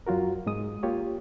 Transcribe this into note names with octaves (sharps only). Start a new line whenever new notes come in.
F#2 F#3 F4 F#4 A#4
G#2 G#3 D#6
A#3 F4 G4 C#5